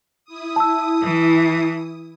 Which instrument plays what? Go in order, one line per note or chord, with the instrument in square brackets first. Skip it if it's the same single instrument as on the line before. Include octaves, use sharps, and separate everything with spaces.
[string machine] E4 D#6
[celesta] A5 E6
[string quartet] E3